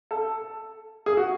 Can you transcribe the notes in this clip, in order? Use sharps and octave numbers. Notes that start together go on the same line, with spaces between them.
A4
G#4
F#4